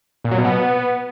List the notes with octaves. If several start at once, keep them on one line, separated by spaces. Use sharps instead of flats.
A#2
F#3
B2
B3